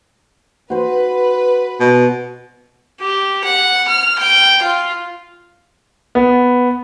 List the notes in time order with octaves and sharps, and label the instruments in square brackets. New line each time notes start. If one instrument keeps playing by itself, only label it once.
[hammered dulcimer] F#4 C5 [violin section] B4
[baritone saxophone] B2
[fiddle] G4
F#5
F6
G5
F4
[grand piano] B3